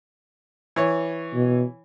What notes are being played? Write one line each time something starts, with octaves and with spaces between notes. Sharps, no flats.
E3 C#5
B2